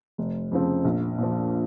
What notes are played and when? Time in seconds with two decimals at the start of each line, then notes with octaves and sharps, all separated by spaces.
0.18 F1
0.52 F2 C#3 F3 C4
0.84 A#1
1.18 A#2 F3